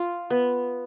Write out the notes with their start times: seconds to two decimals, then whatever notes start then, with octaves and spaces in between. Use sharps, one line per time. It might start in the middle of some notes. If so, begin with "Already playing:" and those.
Already playing: F4
0.30 B3